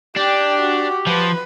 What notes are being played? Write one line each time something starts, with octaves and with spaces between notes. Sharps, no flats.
D4 G4 G5
F#4
F3 B4